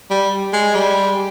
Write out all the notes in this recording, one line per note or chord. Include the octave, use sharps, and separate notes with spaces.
G3
G#3
G3